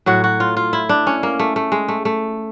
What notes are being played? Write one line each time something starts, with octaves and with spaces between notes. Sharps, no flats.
A2 F#3 F#4
F#4
F4
F4
E4
D4
C#4
A#3
A3
A3
G#3
A3
A3